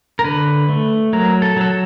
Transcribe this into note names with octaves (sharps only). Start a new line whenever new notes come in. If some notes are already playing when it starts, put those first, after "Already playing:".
A#4
D3 B4
A3
F#3 A#4
A4
F#3 A4